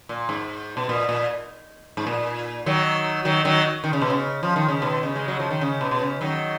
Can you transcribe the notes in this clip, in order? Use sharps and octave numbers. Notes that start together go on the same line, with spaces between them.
A#2
G#2
B2
A#2
A#2
G#2
A#2
D#3 F#3
D#3 F#3
D#3 F#3
D#3
C#3
B2
C#3
F3
D#3
C#3
B2 D#3
C#3
G#3
F#3
F3
D#3
C#3
B2
B2
C#3
D#3 F#3